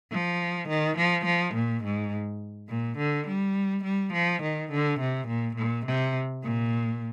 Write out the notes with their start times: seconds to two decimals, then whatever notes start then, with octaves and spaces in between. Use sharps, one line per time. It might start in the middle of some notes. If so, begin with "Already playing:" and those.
0.11 F3
0.68 D#3
0.97 F3
1.25 F3
1.54 A#2
1.84 G#2
2.69 A#2
2.98 D3
3.27 G3
3.84 G3
4.13 F3
4.42 D#3
4.71 D3
5.00 C3
5.28 A#2
5.56 A#2
5.86 C3
6.43 A#2